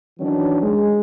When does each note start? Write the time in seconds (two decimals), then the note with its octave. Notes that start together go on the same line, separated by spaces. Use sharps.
0.20 D#3 E3 F#3 C#4 D4
0.63 G#3